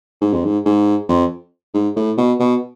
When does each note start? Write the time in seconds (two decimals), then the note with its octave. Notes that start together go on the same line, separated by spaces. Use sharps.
0.21 G#2
0.33 F2
0.45 G#2
0.66 G#2
1.09 F2
1.74 G#2
1.96 A2
2.18 B2
2.40 B2